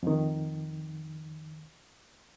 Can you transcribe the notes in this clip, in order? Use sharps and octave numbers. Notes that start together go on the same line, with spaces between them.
F2 D#3